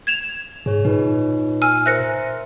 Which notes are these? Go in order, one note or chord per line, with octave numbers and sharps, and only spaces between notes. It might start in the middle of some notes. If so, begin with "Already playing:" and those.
G#6 E7 F7
G#2 G#4 C#5
A#2 D#4 B4 C#5
G#5 E6 F6
A#4 C5 E5 F#6 A#6 C#7